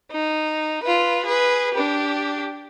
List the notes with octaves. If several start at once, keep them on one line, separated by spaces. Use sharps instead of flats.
D#4
F4 B4
G#4 B4
D4 G4